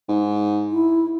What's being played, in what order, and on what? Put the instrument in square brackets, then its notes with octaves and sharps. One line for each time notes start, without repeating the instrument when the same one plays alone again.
[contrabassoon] G#2
[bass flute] E4